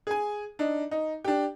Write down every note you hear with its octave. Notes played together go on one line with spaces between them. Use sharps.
G#4 G#5
D4 D#4
D#4
D4 G4